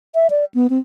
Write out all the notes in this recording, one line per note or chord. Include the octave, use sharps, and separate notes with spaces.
E5
D5
B3
C4